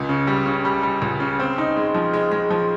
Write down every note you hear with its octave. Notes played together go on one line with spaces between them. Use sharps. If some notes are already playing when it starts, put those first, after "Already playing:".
Already playing: C#2
C#3
G3
C#3
G3
G3
C#2
C#3
C4
D#4
G#3
F3
G#3
G#3
F3